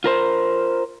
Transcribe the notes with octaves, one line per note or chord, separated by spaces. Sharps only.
F4 A#4 C5